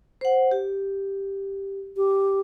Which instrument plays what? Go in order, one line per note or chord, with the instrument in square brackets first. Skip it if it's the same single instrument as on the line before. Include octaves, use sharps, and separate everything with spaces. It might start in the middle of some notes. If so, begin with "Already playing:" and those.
[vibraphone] C5 F#5
G4
[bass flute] G4